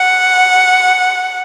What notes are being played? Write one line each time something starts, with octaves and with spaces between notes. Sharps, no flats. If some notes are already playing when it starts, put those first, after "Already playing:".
Already playing: F#5